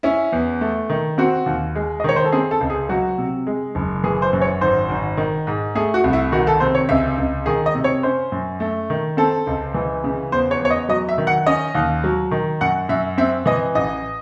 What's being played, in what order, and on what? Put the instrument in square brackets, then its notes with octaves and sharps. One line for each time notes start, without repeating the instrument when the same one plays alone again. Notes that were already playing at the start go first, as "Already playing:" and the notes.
[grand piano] C#4 E4
E2
A3
D#3
C4 F#4
D#2
G#3
D#5
D#3 C#5
C5
A4
C4 G#4
A4
C#2
G#4
F#3 F#4
C3
G#3
F#1
E3 G#4
C5
F#2
C#5
G#1 C5
G#1
D#3
G#2
A3 G#4
F#4
C2
E4
D#3 F#4
A4
C3 C5
C#5
C#2 E5
C#2
D#3 G#4
D#5
C3
C#5
C#4 C5
F#2
A3
D#3
C4 A4
C#2
E3
C#3
E2 C5
C#5
E2 C#5
D#5
F#3 D#5
E5
D#3
F#5
C#4 D#5
D#2
F#3
D#3
F#2 F#5
F#2 E5
C4 E5
E3 D#5
A1 D#5